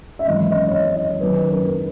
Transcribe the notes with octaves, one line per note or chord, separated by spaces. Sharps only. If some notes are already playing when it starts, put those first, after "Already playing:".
E5
G#1 F#2 E3 D#5
D#5
C#5
D#5
D#5
F#1 F#2 D#3 F#3 B4
B4
A#4